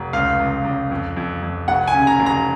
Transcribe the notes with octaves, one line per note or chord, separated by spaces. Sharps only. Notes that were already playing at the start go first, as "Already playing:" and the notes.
Already playing: F1
C#2 F5
C#2
C#2
F2
F2
F2
F1 F#5
G#5
C#3
A#5
F1
A#5